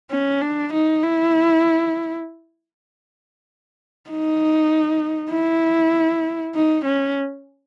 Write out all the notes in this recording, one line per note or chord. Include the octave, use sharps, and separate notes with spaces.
C#4
D4
D#4
E4
D#4
E4
D#4
C#4